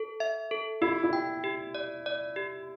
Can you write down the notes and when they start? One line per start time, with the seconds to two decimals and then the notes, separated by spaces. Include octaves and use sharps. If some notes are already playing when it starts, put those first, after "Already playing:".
Already playing: A4
0.20 E5
0.51 A4
0.81 E4 G4
1.03 E4
1.13 G5
1.44 G4
1.75 D5
2.06 D5
2.36 G4